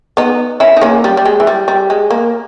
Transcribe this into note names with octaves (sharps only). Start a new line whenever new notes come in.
B3 D#4
C#4 E4
D#4
A#3 C#4
G3
G3
G#3
E3
G3
G3
G#3
A#3